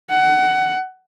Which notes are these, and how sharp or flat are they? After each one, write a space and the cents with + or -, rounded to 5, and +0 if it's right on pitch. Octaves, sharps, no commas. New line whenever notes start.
F#5 +20